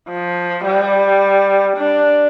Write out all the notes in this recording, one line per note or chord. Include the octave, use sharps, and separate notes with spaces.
F3
G3
D4